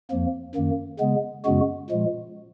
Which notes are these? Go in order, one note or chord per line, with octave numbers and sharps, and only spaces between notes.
F2 F3 A#3
F#2 D#3 A#3
C#3 G#3 B3
F#2 C#3 G#3 B3 F#4
A#2 F3 G#3